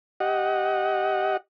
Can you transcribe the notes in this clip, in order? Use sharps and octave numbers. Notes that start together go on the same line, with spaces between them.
G4 D#5 F#5